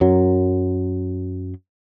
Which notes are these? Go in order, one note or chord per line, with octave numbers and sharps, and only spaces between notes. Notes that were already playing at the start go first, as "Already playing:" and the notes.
F#2 F#3